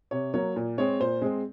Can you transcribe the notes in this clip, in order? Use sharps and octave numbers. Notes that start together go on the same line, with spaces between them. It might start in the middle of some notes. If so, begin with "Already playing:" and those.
C3 C#5
F#3 A#3 C#5
A#2
G#3 C4 C#5
A#2 C5
G#3 C4